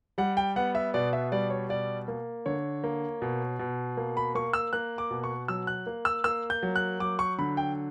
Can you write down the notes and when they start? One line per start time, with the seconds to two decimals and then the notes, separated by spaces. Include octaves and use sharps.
0.18 G3 F#5
0.37 G5
0.56 B3 F#5
0.75 E5
0.94 B2 D5
1.13 E5
1.32 G3 D5
1.50 C#5
1.69 B2 D5
2.08 A#3
2.46 D3 C#5
2.84 A#3
3.22 B2
3.59 B2
3.97 A#3
4.17 B5
4.35 A#3 C#6
4.53 E6
4.73 A#3 F#6
4.98 D6
5.11 B2
5.24 C#6
5.48 F#3 E6
5.67 F#6
5.87 A#3
6.05 E6
6.24 A#3 E6
6.50 G6
6.63 F#3
6.76 F#6
7.00 F#3 D6
7.19 C#6
7.39 D3 B5
7.57 G5